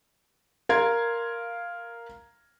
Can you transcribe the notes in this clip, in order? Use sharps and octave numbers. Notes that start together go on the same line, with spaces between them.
A#4 F5 C6 G#6